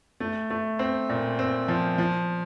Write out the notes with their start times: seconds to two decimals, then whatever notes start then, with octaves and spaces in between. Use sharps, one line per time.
0.20 A3
0.50 A3
0.79 C4
1.09 A#2
1.39 C4
1.68 F3
1.98 F3